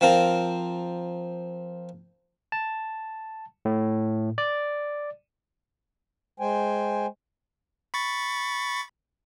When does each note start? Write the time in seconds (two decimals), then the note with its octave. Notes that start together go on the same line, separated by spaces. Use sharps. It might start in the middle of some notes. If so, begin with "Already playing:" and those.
0.01 F3 C4 F4 A#4
2.52 A5
3.65 A2
4.38 D5
6.40 G#3 C5 G5 G#5
7.94 B5 C#6 A6